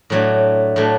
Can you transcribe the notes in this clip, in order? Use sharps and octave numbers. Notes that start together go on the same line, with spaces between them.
A2 F#3 A3 D4
A2 F#3 A3 D4